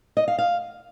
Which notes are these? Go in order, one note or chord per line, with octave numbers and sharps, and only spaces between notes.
D#5
F5
F5